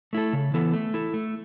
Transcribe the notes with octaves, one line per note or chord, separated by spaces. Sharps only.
A3 E4 A4
C#3
E3 B3 E4 A4
A3
E4 A4
A3